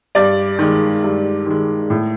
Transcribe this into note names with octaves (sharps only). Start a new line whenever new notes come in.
G2 D5
D#3 G#3
G2
D#3 G#3
A2